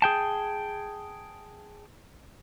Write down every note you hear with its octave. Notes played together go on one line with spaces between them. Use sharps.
G#4 G5 A5